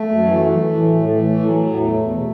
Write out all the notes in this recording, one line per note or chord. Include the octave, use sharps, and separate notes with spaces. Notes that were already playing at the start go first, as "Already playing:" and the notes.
Already playing: A3
F#2
E3
E3
E3
A2
A2
E3 A3
E3
A2 F#3
A2
E2 A3
E2
B2